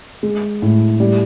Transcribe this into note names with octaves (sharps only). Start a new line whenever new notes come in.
G#3
A2
G3